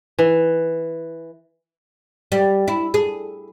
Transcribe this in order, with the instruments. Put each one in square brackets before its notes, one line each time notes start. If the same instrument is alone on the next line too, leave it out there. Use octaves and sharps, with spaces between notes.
[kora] E3
[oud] G3
E4
G#4